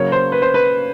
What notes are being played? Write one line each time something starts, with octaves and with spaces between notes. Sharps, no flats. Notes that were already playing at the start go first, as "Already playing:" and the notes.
Already playing: C#3 F#3 A#3 C#5
C5
B4
C5
B4